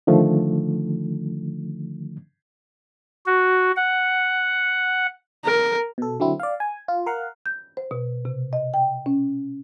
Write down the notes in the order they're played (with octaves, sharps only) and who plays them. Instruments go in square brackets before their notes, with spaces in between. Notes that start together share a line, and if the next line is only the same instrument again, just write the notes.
[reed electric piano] D3 D#3 F3 A3
[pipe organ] F#4
F#5
[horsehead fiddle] A#4
[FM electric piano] B2 A4
D3 F#3 C4 E4
D5 F5
G#5
F4
A#4 F5 F#5
[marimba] G6
C5
B2
C3
D#5
G5
C#4